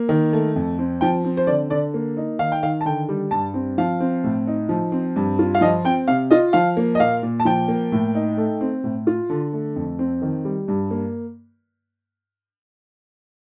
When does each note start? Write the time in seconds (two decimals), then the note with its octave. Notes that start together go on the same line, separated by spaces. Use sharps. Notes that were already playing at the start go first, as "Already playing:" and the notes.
Already playing: A#3
0.09 D#3
0.33 A3
0.56 F2
0.79 C4
1.01 F3 G5
1.24 C4
1.37 C5
1.47 D3 D5
1.70 D3 D5
1.94 A#3
2.17 D#4
2.39 D#3 F5
2.52 G5
2.63 D#3 F5
2.81 A5
2.85 D3 G5
3.09 G3
3.31 G2 A5
3.54 C4
3.78 F3 F5
4.00 C4
4.24 A2
4.47 D#4
4.69 F3
4.92 C4
5.16 G2
5.39 F4
5.55 F5
5.61 F3 D#5
5.85 C4 G5
6.08 C3 F5
6.31 F4 D#5
6.53 F3 F5
6.77 A#3
6.95 D#5
7.00 A#2 F5
7.23 A#2
7.40 A5
7.45 F3 G5
7.68 A#3
7.92 A2
8.15 D#4
8.37 A3
8.61 C4
8.84 A2
9.07 F4
9.30 D3
9.53 A3
9.76 F2
9.99 C4
10.22 D#3
10.45 G3
10.68 G2
10.91 A#3